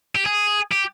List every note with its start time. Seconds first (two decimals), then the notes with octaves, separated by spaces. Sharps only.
0.15 G4
0.26 G#4
0.72 G4